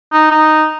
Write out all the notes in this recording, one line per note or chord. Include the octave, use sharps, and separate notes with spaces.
D#4
D#4